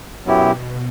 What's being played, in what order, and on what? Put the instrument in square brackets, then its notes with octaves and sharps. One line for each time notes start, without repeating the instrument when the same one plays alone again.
[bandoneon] F#2 F#3 B3 E4 G4 [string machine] B2